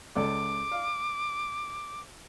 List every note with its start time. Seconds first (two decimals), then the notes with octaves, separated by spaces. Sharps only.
0.15 C#2 A4 D5 D6
0.71 F5